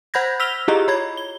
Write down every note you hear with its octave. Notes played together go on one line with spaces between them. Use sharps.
C5 F#5 B5 G6 G#6 A#6
E6 F6 B6 F7 G7
E4 F4 G4 G#4 D#5 A#5
C#5 B5 G#6
G7